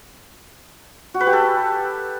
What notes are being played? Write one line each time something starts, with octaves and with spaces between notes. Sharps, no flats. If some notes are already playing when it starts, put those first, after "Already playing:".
F#4
B4
G4
A4